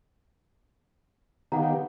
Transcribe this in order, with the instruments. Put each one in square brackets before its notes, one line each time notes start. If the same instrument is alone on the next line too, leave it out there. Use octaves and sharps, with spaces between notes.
[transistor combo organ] D#3 B3 G4 [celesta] F5 F#5 A#5